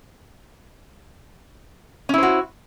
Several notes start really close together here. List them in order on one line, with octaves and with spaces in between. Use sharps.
C#4 E4 C5 F#4